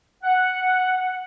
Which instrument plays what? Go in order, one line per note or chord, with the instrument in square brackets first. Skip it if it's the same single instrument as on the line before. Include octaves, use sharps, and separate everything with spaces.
[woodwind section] F#5